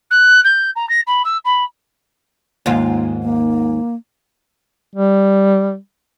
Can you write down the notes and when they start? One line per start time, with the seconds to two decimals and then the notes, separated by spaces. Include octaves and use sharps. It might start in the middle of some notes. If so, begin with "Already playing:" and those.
0.11 F#6
0.44 G6
0.76 A#5
0.89 A#6
1.07 B5
1.25 E6
1.45 B5
2.66 D#2 G#2 F4
3.23 A#3
4.96 G3